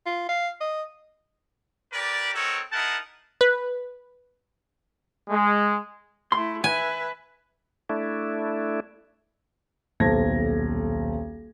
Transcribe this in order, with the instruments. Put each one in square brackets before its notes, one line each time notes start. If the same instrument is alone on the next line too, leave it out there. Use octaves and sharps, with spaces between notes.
[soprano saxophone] F4
F5
D#5
[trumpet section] G4 A#4 B4 D5
C4 D#4 F#4 A4 A#4 C#5
D#4 E4 G#4 A#4 F#5 A5
[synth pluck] B4
[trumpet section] G#3
[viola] A3 E4 [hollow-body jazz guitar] C6
[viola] B4 E5 [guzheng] G#5
[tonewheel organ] A3 D4 E4
[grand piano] D#1 B1 C5 A5 G#6 A#6